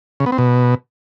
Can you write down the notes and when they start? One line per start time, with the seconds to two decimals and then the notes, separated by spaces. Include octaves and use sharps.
0.20 C#3
0.26 B3
0.32 C4
0.38 B2